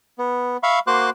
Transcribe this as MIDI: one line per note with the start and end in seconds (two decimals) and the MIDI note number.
0.18 0.57 59
0.63 0.79 76
0.63 0.79 77
0.63 0.79 83
0.63 0.79 85
0.87 1.10 58
0.87 1.10 66
0.87 1.10 72
0.87 1.10 84
0.87 1.10 86
0.87 1.10 90